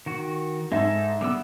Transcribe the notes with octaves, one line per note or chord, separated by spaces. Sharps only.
D#3 F#4
G#2 G#3 D#4 A4 E5
D3 G3 B3 D6 E6